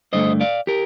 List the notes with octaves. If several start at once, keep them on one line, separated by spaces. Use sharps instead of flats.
G2 D3 A3 C5 D#5
D5 F5
G4 A#4